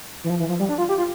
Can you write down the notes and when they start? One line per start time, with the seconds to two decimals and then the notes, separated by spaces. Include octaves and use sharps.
0.24 E3
0.30 F3
0.40 E3
0.49 F3
0.59 G3
0.69 D4
0.78 F4
0.89 G4
0.98 F4